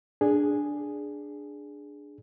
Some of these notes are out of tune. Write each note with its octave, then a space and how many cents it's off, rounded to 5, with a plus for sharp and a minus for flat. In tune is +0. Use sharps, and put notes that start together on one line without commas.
D4 +0 G#4 +0